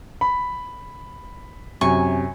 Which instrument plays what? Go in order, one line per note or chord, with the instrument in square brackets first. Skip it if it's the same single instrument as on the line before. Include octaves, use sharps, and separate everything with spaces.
[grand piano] B5
[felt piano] F#2 C3 [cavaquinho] G#5 C#6